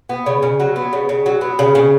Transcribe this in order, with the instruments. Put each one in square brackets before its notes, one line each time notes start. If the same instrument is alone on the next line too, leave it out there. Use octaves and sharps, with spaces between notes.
[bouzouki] B3
C#3
C#3
F#3
B3
C#3
C#3
F#3
B3
C#3
C#3